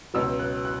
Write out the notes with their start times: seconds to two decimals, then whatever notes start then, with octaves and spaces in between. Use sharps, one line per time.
0.14 C#2 B2 F#3 E6
0.39 F#6
0.65 F#6